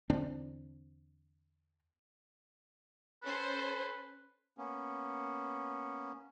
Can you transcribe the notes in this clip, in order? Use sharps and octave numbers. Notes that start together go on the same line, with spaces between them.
E2 D3 C4 D4
C#4 A4 B4 C5
A#3 B3 C#4